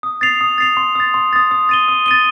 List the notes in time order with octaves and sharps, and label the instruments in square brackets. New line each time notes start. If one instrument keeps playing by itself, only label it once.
[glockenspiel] D#6
A6 C7 F7
D#6
A6 C7 F7
C6
D#6 A6
C6
D#6 A6
D#6
A6 D#7 G7
D#6
A6 D#7 G7